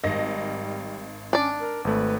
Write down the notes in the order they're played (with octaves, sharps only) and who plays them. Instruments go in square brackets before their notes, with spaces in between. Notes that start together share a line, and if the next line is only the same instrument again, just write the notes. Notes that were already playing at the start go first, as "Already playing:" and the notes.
[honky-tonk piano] G#1 D#5 A#6 [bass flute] G3
[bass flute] C#4 [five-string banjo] D4 D5
[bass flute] A#4
[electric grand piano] G#1 A3 [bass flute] B4